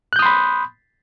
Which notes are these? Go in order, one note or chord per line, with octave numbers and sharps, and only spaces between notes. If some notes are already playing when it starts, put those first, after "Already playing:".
B5 C6 D#6 F#6 G6